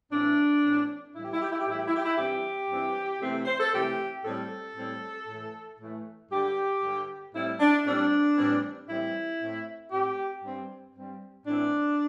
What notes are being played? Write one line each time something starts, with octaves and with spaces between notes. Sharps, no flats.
A2 E3 C4 D4
A2 E3 C4
A2 E3 G3 E4
G4
E4
G4
E4
G4
A2 E3 G3 E4
G4
E4
G4
E4
G2 E3 C4 G4
G2 E3 C4
C3 E3 A3 C4
C5
A4
C3 E3 A3 C4 G4
A2 G3 C4 A4
A2 G3 C4
A2 E3 A3
A2 E3 A3
G2 D3 G3 G4
G2 D3 G3
A2 G3 C4 E4
D4
A2 G3 C4 D4
A2 E3 G3 C4
A2 E3 G3 C4 E4
A2 A3 C4
A2 A3 C4 G4
G2 G3 C4
G2 G3 C4
A2 E3 C4 D4